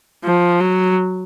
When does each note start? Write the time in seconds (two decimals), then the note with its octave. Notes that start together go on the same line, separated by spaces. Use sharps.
0.24 F3
0.60 F#3